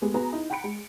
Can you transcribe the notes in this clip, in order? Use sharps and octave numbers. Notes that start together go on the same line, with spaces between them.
G#3 A3 B3 G4 G#4
B3 F#4 G#4 B4 A#5
D#4 E4
F#5 G5 A#5 B5 C#7 D7
G#3